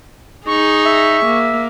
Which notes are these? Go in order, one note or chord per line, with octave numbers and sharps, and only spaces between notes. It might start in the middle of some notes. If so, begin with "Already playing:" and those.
D#4 G#4 C#6
E5
A#3